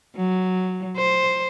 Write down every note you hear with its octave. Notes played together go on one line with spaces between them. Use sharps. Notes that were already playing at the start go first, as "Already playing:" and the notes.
F#3
C5